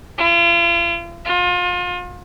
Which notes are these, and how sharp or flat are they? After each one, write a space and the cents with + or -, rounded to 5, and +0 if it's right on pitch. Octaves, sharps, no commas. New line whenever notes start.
F4 -40
F4 +35